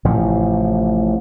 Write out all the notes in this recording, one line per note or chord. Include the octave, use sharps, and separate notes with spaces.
A1 A2 C3 F3